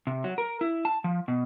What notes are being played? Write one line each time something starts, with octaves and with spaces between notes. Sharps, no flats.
C3
F#3
A#4
E4
A5
F3
B2